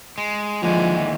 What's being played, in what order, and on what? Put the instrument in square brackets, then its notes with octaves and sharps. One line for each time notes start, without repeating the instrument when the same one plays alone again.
[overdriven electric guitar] G#3
[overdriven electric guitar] D#2 D3 [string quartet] E3 G#3 [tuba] F3